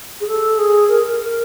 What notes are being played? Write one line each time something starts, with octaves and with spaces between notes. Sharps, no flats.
G#4
A4
G#4
A#4
A#4
A#4